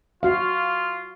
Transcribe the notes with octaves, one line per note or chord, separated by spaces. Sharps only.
F4 F#4 F5